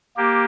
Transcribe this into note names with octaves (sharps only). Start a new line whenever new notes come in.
A#3 G4